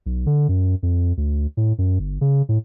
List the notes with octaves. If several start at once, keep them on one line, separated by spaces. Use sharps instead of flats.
B1
D3
F#2
F2
D2
A2
F#2
G1
C#3
A2